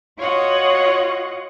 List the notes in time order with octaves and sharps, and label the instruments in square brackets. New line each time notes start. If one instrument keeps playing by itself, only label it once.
[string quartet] F4 F#4 C#5 D#5 F#5